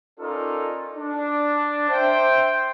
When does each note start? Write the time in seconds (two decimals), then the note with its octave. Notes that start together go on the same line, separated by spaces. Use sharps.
0.20 C#4 D#4 F4 A4 A#4 D5
0.96 D4
1.89 C5 E5 G5